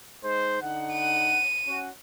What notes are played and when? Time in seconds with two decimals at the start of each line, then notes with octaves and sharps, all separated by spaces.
0.24 G#3 D#4 C5
0.62 D3 D#4 F#5
0.93 D#7
1.67 C#4 F#4